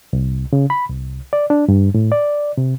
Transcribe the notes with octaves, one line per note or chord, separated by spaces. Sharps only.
C2
C#3
B5
C2
D5
D4
G2
A2
D5
C3